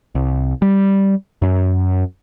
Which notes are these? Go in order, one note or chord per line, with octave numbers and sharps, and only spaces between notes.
C2
G3
F#2